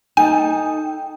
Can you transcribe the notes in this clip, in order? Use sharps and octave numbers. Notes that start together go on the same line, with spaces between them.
D#4 A4 D#5 G5 G#5